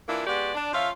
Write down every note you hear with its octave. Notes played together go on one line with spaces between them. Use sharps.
E3 A#3 D4 E4 F4
G#3 B3 F#4 G4 D5
D4
F3 C#4 F4 E5 F5